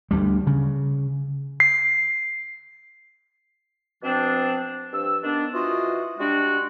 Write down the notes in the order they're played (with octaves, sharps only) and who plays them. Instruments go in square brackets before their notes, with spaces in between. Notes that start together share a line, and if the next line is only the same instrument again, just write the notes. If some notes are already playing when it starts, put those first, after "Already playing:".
[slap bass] D2 G3
C#3
[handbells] C7
[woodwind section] B2 F3 C4 D4
G2 F3 E6
D#3 B3 D4
E3 F4 F#4 C5 D#5
G3 G#3 D4 F#4